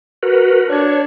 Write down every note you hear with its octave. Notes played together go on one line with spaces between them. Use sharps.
F#4 A#4 B4
D4 C#5